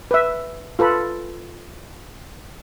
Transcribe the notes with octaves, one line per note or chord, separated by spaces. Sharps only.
B4 E5
F4 A4 B4 B5